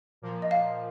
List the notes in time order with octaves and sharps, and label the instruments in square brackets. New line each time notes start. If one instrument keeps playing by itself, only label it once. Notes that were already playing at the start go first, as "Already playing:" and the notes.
[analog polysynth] A#2 F3 A#3
[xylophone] D#5
F5